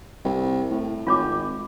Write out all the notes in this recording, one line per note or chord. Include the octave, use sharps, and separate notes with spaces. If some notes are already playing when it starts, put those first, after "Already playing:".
C2
A2
G#1 F4 C#5 D6